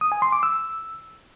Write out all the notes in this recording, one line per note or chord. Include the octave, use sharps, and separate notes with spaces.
D#6
G#5
C6
D6
E6